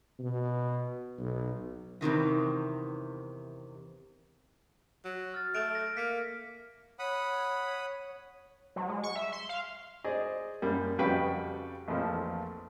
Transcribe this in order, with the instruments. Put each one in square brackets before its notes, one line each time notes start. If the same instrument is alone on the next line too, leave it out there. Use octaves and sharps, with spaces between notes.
[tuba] B2
B1
[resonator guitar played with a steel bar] E2 C3 D#3 E3
[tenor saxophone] F#3
[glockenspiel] F6 A6
[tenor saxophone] A3 [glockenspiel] D7
[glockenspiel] A#6
[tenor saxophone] A#3 [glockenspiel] B6 C#7
[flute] C#5 [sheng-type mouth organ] F#5 B5 D#6
[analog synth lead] F#3
G#3
C#6
E5
C6
F5
[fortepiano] G#4 C5 D5 D#5
F#2 G3 A#3
F2 C#3 G3 F#4 B4 G5
A#1 F2 E3 F3 A3